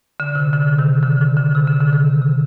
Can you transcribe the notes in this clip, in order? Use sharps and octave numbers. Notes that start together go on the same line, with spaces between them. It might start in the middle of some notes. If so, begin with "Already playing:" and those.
D3
C3
D3
C3 D#3
D3
D3
D3
C3
D3
D3
C3 D#3
C3